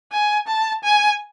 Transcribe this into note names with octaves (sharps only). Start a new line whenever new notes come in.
G#5
A5
G#5